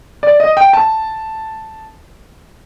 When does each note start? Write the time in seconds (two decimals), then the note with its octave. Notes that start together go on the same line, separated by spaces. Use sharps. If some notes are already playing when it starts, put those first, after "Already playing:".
0.23 D5
0.40 D#5
0.57 G5
0.73 A5